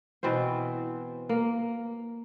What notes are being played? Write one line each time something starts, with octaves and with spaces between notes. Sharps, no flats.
B2 E3 C4 C5
A#3